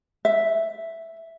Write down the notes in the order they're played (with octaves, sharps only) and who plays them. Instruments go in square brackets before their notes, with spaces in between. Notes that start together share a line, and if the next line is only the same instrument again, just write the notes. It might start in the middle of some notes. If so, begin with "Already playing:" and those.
[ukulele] E5